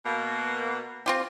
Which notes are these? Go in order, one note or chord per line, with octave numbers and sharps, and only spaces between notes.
B2 A#3
C4 F4 G4